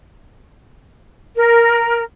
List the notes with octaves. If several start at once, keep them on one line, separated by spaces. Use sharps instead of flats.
A#4